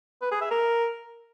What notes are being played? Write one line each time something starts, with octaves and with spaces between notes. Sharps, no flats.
B4
G#4
E5
A#4